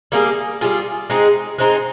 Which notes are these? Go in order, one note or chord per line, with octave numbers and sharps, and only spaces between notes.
G3 A#3 F4 G#4
G3 A#3 F4 G#4
G#3 C4 D#4 G#4
G#3 C4 D#4 G#4